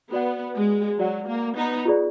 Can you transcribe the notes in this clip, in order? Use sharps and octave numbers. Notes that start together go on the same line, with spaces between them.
B3 F#4 D5 F#5
G#3
F#3 F#4 D5 F#5
A#3
B3 D#4
F4 G#4 D5